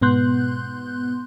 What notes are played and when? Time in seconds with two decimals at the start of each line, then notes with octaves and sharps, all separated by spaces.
0.01 G#2 B2 B3 C6 F#6 G6